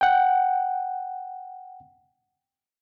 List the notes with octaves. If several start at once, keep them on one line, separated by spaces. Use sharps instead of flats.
F#5 G5